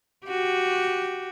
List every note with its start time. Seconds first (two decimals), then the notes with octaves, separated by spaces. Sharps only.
0.27 F#4 G4